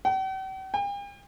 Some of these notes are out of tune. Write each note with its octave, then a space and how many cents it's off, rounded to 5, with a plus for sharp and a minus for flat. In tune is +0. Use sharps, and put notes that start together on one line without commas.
G5 -45
G5 +45